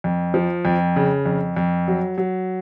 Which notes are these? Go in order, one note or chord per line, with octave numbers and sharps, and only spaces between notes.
F2
F3
F2
C#3
F2
F2
F#3
F#3